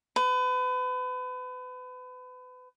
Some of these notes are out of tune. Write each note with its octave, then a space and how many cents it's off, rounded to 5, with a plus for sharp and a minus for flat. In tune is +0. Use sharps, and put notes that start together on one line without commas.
B4 +35